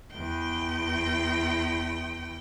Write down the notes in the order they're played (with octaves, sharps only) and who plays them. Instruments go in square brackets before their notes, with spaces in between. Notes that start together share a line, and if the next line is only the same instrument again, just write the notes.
[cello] E2 G5